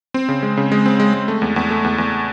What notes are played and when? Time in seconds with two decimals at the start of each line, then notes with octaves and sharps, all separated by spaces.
0.14 C4
0.29 C#3
0.43 G#3
0.57 C#3
0.72 G#3
0.86 C4
1.00 G#3
1.14 G#3
1.28 A3
1.42 E2
1.56 E2
1.70 A3
1.84 E2
1.98 E2